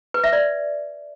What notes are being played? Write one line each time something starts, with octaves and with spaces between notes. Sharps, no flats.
B4
E5
D5